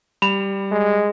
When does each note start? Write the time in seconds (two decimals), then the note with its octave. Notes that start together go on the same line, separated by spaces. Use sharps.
0.22 G3 B5 F7
0.72 G#3